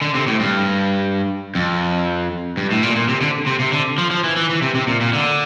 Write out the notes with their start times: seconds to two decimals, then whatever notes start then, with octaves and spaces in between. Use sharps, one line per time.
0.01 D3
0.15 C3
0.27 A2
0.40 G2
1.55 F2
2.57 G2
2.71 A2
2.83 A#2
2.96 A#2
3.08 C3
3.21 D3
3.46 C3
3.60 C3
3.72 D3
3.98 F3
4.11 F3
4.24 E3
4.36 E3
4.49 E3
4.62 C3
4.75 C3
4.88 A#2
5.01 A#2
5.13 D3